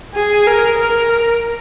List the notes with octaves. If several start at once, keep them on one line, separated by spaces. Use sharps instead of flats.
G#4
A#4
A#4